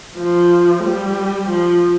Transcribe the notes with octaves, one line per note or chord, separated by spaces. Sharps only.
F3
G3
F3